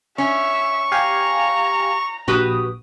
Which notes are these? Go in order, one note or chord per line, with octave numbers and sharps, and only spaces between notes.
C#4 E5 C#6
G4 F5 G#5 A#5
A#1 F#4 G4 B4 D#6